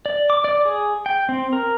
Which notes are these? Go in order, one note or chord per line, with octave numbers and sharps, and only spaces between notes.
D5
D6
D5
G#4
G5
C4
A#4